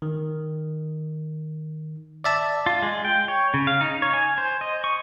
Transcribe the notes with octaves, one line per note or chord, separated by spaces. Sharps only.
D#3
D5 E5 A5
F4
G#3
G5
C#5
C#3
F5
D#4
C#5
G#5
C5
D#5
C#6